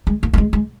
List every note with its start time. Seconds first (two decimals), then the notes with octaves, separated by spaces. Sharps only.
0.07 G#3
0.23 A#3
0.34 A#3
0.38 G#3
0.53 G#3